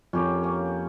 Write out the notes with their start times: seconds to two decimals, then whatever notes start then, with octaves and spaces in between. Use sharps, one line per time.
0.13 F2 C#4 G4 A#4
0.43 A#3 C#4